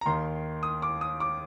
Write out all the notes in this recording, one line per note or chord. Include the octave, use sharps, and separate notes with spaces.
A#5
D#2 D#3 C6
D#6
D6
D#6
D6